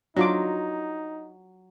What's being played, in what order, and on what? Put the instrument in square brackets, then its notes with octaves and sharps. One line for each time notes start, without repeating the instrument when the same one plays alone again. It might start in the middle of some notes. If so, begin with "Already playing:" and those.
[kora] F#3 [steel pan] D4 F4 D6 [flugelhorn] D#4